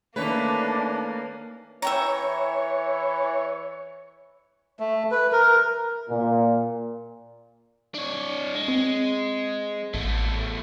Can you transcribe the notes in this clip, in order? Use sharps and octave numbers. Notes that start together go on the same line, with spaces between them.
D#3 A3 A#3 C#4 D4 B4
E3 C#5 E5 G5 A#5
A3
B4
A#4
A#2
D4 C#5
G#3
C4
A1 E2 A3